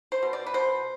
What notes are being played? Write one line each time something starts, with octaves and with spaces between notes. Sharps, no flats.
C5
B2
D5
B4
B2 C5